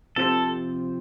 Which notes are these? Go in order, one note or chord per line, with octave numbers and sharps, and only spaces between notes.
C3 F3 C4 F4 A4 C5